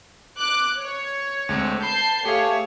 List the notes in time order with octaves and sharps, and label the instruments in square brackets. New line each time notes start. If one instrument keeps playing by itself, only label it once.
[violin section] D6 F#6
C#5
[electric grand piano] D2 G#3 C4
[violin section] A5 G6 C7 [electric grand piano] B5
[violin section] A3 C#5 [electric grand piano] G4 G#4 F5